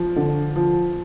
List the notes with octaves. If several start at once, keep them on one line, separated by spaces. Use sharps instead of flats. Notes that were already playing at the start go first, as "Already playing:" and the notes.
Already playing: F3
D3
F3